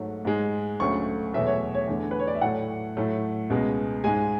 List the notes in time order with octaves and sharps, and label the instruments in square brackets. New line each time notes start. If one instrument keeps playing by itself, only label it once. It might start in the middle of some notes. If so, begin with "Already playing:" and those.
Already playing: [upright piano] G#2 F#3 A3
G#2 G#3
D2 C#3 F#3 A3 C#6
E2 B2 F#3 A3 E5
C#5
C#5
E2 D3 A3
B4
C#5
D5
E5
A2 F#3 A3 F#5
A2 F#3 A3
C#2 B2 G#3
G#2 G#3 G#5